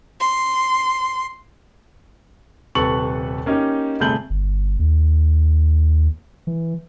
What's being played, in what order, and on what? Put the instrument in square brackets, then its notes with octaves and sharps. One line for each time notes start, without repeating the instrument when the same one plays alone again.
[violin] C6
[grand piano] D#1 C3 A4 B4 C#6 F#7
A#3 C#4 D#4 G4
G1 C3 A3 G#4 G6 F#7
[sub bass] G1
D#2
E3